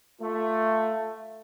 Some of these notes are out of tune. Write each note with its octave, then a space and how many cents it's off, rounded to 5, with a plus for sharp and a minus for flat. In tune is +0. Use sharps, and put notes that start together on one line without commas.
A3 +10 F4 +5